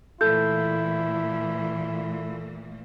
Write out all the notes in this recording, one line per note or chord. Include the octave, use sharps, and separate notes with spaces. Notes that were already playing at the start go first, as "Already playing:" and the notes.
A#2 E3 A3 E4 A4 G6